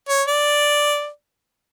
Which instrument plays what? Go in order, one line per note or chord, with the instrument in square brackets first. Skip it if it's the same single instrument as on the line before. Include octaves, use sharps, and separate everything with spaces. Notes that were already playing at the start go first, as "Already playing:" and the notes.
[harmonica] C#5
D5